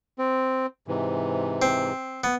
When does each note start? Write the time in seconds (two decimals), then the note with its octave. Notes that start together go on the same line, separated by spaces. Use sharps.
0.19 C4
0.88 G#2 C3 E3
1.62 C4
2.24 B3